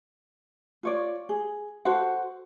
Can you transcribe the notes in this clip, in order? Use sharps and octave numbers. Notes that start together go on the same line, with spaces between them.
F4 C#5 D5
G#4
F#4 A4 C5 F#5